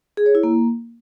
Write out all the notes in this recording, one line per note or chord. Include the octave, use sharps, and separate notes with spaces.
G#4
C#5
E4
A#3